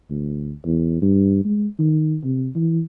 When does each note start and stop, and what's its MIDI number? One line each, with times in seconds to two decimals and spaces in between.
0.10 0.53 38
0.66 0.98 40
1.02 1.45 43
1.45 1.67 56
1.79 2.17 51
2.24 2.49 48
2.55 2.81 52